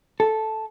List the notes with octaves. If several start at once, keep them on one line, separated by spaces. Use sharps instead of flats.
A4